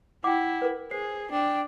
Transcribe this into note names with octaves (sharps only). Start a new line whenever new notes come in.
E4 F#5 G5 D6
A#4 B4
G#4 C5 C7
D4 G5